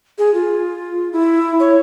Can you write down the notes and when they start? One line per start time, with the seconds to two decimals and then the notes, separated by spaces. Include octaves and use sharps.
0.18 G#4
0.34 F4
1.13 E4
1.60 C#5